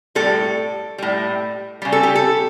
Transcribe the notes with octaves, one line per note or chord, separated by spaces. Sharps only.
A2 G3 A4
A2 G3
C#3 G3
A4
G4
A4